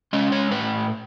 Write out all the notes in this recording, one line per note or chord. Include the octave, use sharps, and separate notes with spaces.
G#3 C#4 D#5
C#5
A2 B4